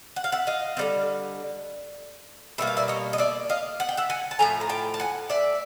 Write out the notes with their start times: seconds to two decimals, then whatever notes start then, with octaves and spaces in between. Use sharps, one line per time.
0.16 F#5
0.24 F5
0.32 E5 F#5
0.47 D#5 F5
0.77 D3 G3 C4
2.58 B2 G3 A#3 E5
2.67 F5
2.77 D5 E5
2.88 C#5 D#5
3.13 D#5
3.18 D5 E5
3.49 D#5 F5
3.80 F#5
3.89 G5
3.97 E5 F#5
4.10 F#5 G#5
4.31 A5
4.39 A2 F3 A3 G#5 A#5
4.61 A#5
4.69 G5 A5
4.94 A5
5.00 F#5 G#5
5.30 D5 E5